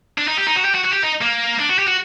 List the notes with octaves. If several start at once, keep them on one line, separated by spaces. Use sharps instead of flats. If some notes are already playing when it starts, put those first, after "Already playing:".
D4
D#4
G4
D#4
F#4
G4
F#4
F#4
G4
D#4
A#3
D4
F#4
G4
F#4